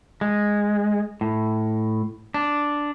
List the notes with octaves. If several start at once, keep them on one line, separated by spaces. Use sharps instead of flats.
G#3
A2
D4